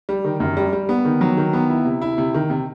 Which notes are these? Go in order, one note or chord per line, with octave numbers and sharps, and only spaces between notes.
G3
D#3
F#2
G3
G3
B3
D#3
F#3
D#3
B3
E4
C3
E4
C3
D#3
C3